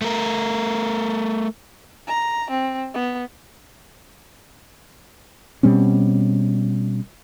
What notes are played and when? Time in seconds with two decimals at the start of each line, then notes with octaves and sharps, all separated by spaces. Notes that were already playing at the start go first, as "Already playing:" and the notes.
0.02 A3 A#4
2.07 A#5
2.50 C4
2.94 B3
5.63 B2 G3 C4 C#4